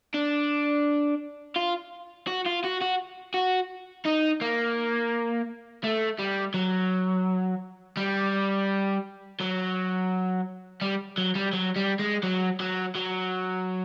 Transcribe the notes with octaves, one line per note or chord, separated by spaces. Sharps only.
D4
F4
F#4
F4
F#4
F#4
F#4
D#4
A#3
A3
G3
F#3
G3
F#3
G3
F#3
G3
F#3
G3
G#3
F#3
F#3
F#3